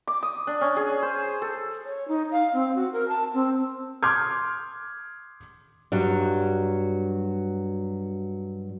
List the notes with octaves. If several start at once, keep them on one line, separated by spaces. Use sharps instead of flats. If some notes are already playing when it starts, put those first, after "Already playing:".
D6
D#6
D4
C#4
G#4
C5
A4
C#5
D#4
F5
C4
F#4
A#4
A5
C4
C6 D6 D#6 F6 G6 G#6
G2 F#3 G3